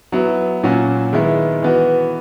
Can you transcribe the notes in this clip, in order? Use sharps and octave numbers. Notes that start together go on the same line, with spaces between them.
F#3 B3 E4
A#2 F#3 C#4 F#4
D#3 G#3 B3 E4
E3 B3 F#4